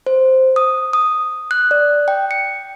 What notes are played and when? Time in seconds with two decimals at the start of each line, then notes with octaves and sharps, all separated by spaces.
0.06 C5
0.56 D#6
0.93 D#6
1.51 F#6
1.71 D5
2.08 G5
2.31 C#7